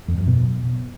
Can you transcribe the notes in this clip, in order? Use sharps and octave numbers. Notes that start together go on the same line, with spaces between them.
F2
F#2
B2